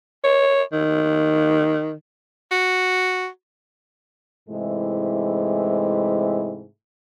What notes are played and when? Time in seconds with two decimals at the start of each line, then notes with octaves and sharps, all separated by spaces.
0.24 C#5
0.73 D#3
2.52 F#4
4.48 G#2 C3 E3 G#3 A3 E4